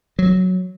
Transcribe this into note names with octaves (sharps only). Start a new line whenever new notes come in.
F#3